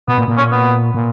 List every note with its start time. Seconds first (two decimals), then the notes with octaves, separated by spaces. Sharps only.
0.08 B2 B3
0.18 A#2
0.28 A#2
0.37 C#4
0.52 B3
0.95 A#2